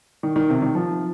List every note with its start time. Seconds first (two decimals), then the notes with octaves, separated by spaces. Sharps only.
0.23 D#3
0.36 D#3
0.49 C3
0.62 D#3
0.75 F3